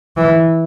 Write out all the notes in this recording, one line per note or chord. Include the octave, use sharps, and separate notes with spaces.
E3